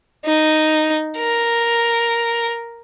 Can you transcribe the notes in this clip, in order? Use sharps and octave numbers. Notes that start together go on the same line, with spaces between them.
D#4
A#4